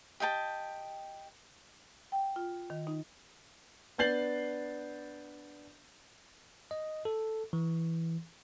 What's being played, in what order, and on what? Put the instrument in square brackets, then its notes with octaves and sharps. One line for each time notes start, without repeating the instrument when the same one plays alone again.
[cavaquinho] G4 D#5 G5 A5
[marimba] G5
F4
D#3
D#4
[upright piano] B3 D4 G6 A6 C7 F#7
[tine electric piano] D#5
A4
E3